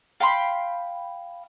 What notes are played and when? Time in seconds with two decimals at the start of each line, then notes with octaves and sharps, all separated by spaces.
0.20 F5 G5 B5 C6